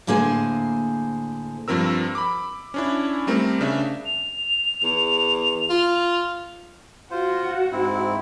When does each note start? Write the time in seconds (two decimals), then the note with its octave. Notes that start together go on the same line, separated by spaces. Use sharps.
0.07 A2 D3 A#3 G#4 C5 G#5
1.68 G2 F3 C4 A#4 E6
2.15 B5 D6
2.74 C#4 D4 E4
3.27 G3 A3 C4 A#4
3.61 C#3 D4 E5
4.06 F7
4.84 E2
5.70 F4
7.11 F4 F#4 C5
7.72 G#2 C4 E4